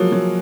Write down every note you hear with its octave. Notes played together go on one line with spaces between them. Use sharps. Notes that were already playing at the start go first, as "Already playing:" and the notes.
Already playing: F3 F#3 G#3 A#3
F#3